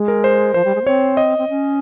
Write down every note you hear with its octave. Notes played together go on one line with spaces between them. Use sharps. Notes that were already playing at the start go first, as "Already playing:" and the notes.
Already playing: G#3
A#4
C5
F3 C5
G3
G#3
A#3
C4 C#5
D#5
C4
C#4